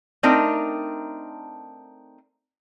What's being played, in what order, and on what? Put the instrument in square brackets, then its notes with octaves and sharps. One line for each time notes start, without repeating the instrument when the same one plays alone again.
[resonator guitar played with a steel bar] A3 C4 D4 D#4 A#4